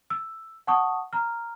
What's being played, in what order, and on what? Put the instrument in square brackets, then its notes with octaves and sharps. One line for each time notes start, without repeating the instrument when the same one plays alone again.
[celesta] E6
F#5 A5 C#6 D#6
A#5 F6